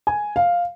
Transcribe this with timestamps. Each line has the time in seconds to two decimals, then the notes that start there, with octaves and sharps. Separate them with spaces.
0.07 G#5
0.36 F5